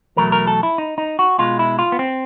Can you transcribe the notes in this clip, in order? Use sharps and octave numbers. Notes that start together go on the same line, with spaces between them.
E2 B2 F#3 A3 A#4
A#4
A4
E4
D#4
D#4
F#4
B2 G#3 F4
E4
F4
B3
C4